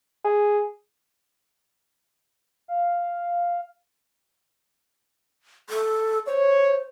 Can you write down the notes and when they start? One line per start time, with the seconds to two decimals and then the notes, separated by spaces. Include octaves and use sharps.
0.24 G#4
2.68 F5
5.70 A4
6.27 C5 C#5